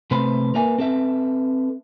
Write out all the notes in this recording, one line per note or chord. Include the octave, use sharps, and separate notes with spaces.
C3 A3 B4 C5 B5 C6
A#3 A#4 B4 E5 G#5
C4 A4 B4 E5